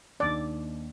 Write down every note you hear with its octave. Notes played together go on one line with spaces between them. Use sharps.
D#2 D#3 A#3 D4 D5